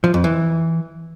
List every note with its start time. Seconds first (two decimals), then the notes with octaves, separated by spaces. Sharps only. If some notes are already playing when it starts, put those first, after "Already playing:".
0.04 F3
0.14 F2
0.24 E3